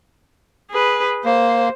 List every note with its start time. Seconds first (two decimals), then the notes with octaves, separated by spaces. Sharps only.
0.70 G#4 B4
1.25 A#3 C5